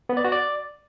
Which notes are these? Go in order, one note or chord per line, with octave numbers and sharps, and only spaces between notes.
B3
D5
F#4
D5